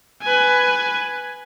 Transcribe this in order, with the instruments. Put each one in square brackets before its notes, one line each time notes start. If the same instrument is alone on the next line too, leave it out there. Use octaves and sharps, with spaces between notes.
[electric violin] B4 G#5